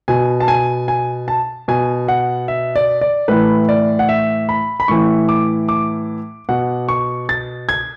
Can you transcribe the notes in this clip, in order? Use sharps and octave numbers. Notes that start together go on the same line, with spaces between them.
B2 G#5
A5
G#5
G#5
A5
B2 G#5
F#5
E5
D5
D5
A2 E3 B4
D5
F#5
E5
B5
B5
A2 E3 C#6
D6
D6
B2 F#5
C#6
A6
G#6